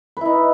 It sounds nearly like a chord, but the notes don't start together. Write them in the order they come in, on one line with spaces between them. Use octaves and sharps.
B4 E4 D#4